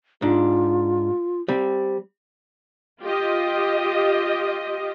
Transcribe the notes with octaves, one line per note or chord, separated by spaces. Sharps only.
G#2 D4 F4
G3 C4
F4 G4 D#5